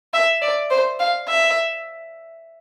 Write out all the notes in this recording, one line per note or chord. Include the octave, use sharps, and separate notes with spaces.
E5
D5
C5
F5
E5